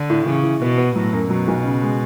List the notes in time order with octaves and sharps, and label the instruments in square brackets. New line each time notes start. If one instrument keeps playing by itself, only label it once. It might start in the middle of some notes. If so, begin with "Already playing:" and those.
Already playing: [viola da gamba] D3
[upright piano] A2
[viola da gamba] C#3 [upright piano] E3
[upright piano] E3
[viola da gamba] B2 [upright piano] B3
[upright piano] B3
[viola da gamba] A2 [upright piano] F#3
[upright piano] F#2
[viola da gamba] B2 [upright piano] F#3
[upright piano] B1
C#3
G#3